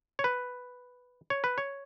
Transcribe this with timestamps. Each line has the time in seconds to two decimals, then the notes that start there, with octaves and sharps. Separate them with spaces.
0.19 C#5
0.24 B4
1.30 C#5
1.44 B4
1.58 C#5